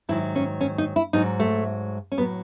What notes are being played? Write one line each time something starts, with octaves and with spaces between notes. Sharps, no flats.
G#2 D#3 F#3 E4
C#4
C#4
D#4
E4
G#2 F#3 D#4
A3
C#4
A2 F#3 B3